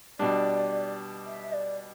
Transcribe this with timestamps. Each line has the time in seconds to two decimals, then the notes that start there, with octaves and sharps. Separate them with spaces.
0.19 B2 G3 D4 D5
1.26 E5
1.53 D5